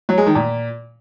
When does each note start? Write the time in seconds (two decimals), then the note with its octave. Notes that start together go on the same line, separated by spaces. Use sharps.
0.09 F#3
0.18 G#3
0.26 D#3
0.35 A#2